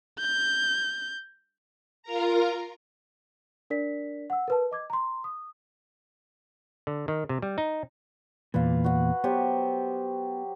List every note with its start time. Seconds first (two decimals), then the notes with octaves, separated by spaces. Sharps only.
0.20 G6
2.03 F4 A#4 A#5
3.70 D4 A#4 D5 B6
4.30 F#5 E6
4.48 A#4 B4 A5
4.71 D#5 D6 G#6
4.90 A#5 C6
5.24 D#6
6.87 D3
7.08 D#3
7.29 C3
7.42 G3
7.58 D#4
8.54 E2 A#2 B4 F5
8.84 F#4 F#5
9.24 F#3 B3 G4 C5